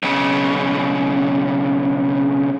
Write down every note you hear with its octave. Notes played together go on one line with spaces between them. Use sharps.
B1 C#3